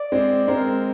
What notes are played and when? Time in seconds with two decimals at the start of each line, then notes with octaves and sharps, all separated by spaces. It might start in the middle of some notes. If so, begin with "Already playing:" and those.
Already playing: D5
0.12 G#3 C4
0.48 G#3 C4 A#4